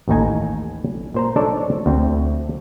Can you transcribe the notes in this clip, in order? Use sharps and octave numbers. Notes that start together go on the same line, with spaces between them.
A1 D#2 A2 D#4 G#5
A#2 C5 A#5
D4 D#4 A4 C#5 D5
D2 C4